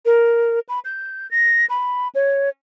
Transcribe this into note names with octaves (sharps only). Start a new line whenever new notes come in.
A#4
B5
G6
A#6
B5
C#5